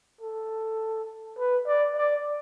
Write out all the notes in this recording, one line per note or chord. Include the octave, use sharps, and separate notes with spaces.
A4
B4
D5
D5